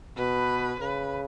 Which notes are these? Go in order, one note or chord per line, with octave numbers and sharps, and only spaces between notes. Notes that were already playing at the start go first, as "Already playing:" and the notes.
B2 B4
C#3 B4